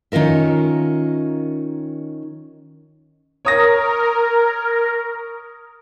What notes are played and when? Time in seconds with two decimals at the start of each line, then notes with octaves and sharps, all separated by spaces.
0.12 D#3 C#4 F4 A#4 E5
3.45 A#4 C#5 D#6 A#6